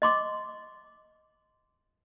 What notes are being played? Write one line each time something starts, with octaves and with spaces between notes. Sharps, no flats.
D#5 C6 D6